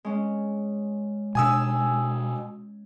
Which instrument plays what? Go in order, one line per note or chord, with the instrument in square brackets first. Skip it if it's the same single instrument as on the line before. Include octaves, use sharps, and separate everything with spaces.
[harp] G#3 C#4
[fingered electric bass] B2 D4 [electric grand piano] G#5 D#6 E6